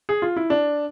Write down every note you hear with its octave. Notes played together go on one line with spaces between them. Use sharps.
G#4
F4
E4
D4